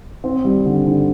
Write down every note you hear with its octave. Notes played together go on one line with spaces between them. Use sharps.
C4
G3
D3
D3